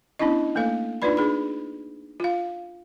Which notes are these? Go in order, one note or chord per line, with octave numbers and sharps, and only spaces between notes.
B3 C#4 D4 E4 D#5
A3 A#3 A4 F5
D4 D#4 F4 B4 D5 B5
D4 G#4 B5
F4 F5